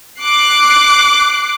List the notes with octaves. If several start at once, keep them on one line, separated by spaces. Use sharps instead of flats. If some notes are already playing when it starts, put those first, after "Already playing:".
D6 F#6 C7